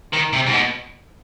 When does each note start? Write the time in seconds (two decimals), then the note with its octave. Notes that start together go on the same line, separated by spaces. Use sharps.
0.13 D#3
0.33 C3
0.47 G#2
0.53 B2